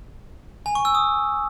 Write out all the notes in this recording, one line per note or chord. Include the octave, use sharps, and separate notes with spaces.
G#5
C#6
E6
D#6